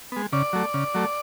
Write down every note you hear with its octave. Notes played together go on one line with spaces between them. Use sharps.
G#3 B3
C#3 D5
F#3 A3
C#3
F#3 A3